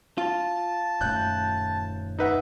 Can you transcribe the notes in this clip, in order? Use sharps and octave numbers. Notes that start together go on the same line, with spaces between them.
F4 A5
D#1 F#2 A3 F#6 G6
D#4 B4 E5 F#5